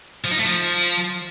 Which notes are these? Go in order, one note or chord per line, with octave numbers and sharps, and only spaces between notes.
F3
D#4
A3
F3